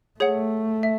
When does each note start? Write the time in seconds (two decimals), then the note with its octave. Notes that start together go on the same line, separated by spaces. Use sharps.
0.20 A3 G#4 C#5 F#5
0.83 E5